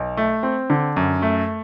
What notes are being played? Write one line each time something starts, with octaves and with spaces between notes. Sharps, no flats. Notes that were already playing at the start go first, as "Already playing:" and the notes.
Already playing: B1
A3
C4
D3
F#2
A3